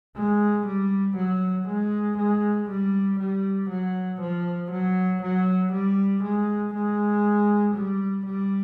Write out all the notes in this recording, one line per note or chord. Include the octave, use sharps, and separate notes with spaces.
G#3
G3
F#3
G#3
G#3
G3
G3
F#3
F3
F#3
F#3
G3
G#3
G#3
G3
G3